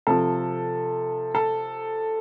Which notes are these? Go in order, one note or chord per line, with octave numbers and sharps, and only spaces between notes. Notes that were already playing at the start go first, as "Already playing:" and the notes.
C3 F3 A4
A4